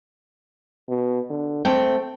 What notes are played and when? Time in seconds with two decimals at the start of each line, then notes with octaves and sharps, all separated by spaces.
0.89 B2
1.30 D3
1.65 A3 C4 G5